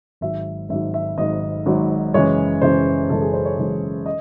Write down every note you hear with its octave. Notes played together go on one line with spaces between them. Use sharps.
G#1 G#2 F#3 E5
G#1 G#2 F#3 E5
E5
G#1 G#2 F#3 D#5
G#1 G#2 F#3
F#1 F#2 E3 G#3 C#5
F#1 F#2 E3 G#3 C5
F#1 F#2 E3 G#3 A4
G#4
C5
C#5
F#1 F#2 E3 G#3
D#5